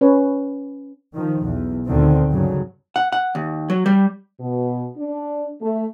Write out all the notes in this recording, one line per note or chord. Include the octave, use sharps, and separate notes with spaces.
C#4 B4 C#5
D#3 F3
B1 E2
D2 A#2 D3 D#3 C4
G2 C#3 F#3
F#5
F#5
D#2
F#3
G3
B2
D4
A3